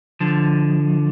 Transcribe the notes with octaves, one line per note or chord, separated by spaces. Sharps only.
D3 F3